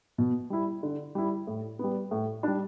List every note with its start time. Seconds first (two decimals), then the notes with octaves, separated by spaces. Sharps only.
0.18 B2
0.50 G3 E4
0.83 D3
1.15 G3 E4
1.47 A2
1.79 G3 B3
2.11 A2
2.43 G3 D4